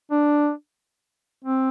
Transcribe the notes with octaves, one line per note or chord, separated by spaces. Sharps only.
D4
C4